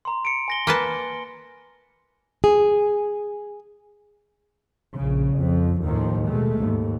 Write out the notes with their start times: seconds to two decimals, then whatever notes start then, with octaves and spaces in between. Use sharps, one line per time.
0.05 A#5 C6
0.25 C#7 D7
0.48 G#5 A#6 G7
0.67 A#3 B4 G#5 A5
2.44 G#4
4.96 A#1 C#3
5.36 F2 F3
5.82 D#2 A2 D#3 F3
6.28 B2 G#3 A3
6.60 D#2 G#2